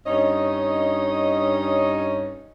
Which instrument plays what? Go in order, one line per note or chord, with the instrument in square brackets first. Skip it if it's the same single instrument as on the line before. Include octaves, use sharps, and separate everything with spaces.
[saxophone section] G2 C#4 D#4 C#5 D#5